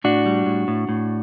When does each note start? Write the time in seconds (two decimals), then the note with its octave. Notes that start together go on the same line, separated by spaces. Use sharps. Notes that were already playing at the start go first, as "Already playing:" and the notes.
0.04 A2 D4 F#4
0.26 G3
0.46 A2
0.68 A2
0.89 A2